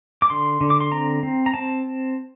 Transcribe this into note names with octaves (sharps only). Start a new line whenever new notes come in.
D6
D3 C6
D3
D6
C6
C4 A#5
C4
A#5
C4 A5